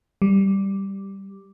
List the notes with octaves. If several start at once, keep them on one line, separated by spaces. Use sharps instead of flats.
G3